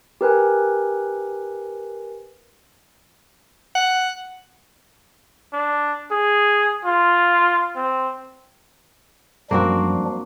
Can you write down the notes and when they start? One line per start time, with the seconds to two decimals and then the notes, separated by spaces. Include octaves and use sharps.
0.21 G4 A#4 B4 G#5
3.75 F#5
5.53 D4
6.12 G#4
6.85 F4
7.76 C4
9.51 F#2 F3 G3 A#3 C4 D4 F#4